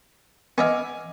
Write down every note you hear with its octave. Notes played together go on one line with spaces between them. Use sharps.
B3 D#5 E5 G#5 D6 F6